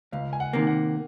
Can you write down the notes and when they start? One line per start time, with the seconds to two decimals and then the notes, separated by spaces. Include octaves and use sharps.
0.12 C#2 F5
0.33 G#5
0.40 F#5
0.53 C3 D#3 A#3
0.67 F#5